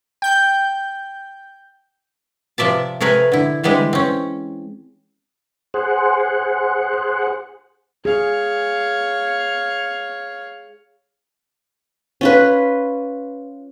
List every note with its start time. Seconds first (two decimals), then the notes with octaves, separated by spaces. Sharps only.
0.22 G5 G6
2.58 C3 F3 D5 E5 A5
3.01 C3 A3 G#4 A#4 B4
3.32 D3 E4
3.63 D3 E3 G3 G#3 C4 B4
3.93 C4 C#4
5.74 G#4 C5 F#5
8.05 G#4 C#5 F5
12.21 C#4 F4 B4